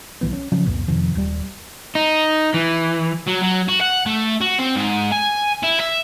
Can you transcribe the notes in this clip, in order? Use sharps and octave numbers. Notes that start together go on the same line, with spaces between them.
B1 F2 E3 B3
C#4
C#3 F3 F#3 C#4
C2 F2 A#2 B3
F2 C3 D#3 F3
D#1 G3
D#4
E3
F#3
F#3
F#4
F#5
A3
F#4
C4
G#2
G#5
E4
E5